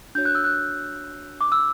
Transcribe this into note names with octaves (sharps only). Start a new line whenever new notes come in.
D4 F#4 C#5 G6
F#6
E6
F#6
D6
E6